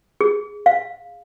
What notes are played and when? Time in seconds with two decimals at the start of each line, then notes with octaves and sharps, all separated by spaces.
0.21 G#4
0.66 F5